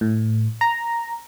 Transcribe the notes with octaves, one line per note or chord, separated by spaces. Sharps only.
A2
A#5